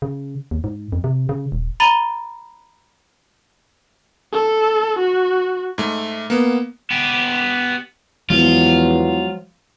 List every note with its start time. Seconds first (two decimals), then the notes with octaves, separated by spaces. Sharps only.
0.02 C#3
0.51 D#2
0.64 G#2
0.92 F2
1.04 C3
1.29 C#3
1.52 D#1
1.80 A#5 B5 A6 D#7 G7
4.33 A4
4.99 F#4
5.78 G#2 A3
6.30 A#3 B3
6.91 B3 G4
8.30 E2 F3 F#3 G#3 F4